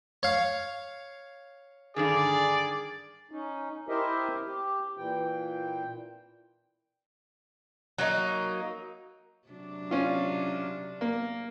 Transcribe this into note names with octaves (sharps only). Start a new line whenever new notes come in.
C#5 F5
G2 D3 D#3 G#4 D5
C#4 D#4
E4 G4 A#4 C5 D#5 E5
G4
A#2 E3 G5
F#3 A#3 D#4
C3 F#3 D4
C#4 F4
A#3